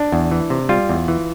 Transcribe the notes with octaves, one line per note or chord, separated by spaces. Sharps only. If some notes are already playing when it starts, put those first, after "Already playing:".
Already playing: D4
E2
E3
C3
G3 F4
E2
E3